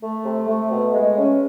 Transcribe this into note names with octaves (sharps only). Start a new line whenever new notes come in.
A3
C3
A3
B2
G#3
C#4